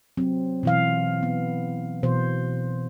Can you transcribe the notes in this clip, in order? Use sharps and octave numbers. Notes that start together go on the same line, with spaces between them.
F#3 C4
B2 E3 F5
B3
B2 E3 C5